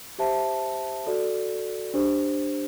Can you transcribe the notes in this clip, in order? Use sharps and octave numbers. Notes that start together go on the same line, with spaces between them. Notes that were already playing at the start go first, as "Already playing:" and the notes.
G4 C5 E5 A5
F#4 A4 D5
D4 G4 C5